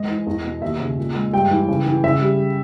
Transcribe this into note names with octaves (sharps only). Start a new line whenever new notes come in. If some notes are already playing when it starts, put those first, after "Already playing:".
Already playing: G#2 G#3 D#5
E3
E2
B2
D#2 E5
C#3
A#2
G#3
G2 G5
E3
C#3
E3
C#3 E5
G3